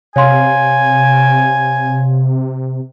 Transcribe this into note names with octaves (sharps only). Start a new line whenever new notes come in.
C3 C#5 F5 G#5 C6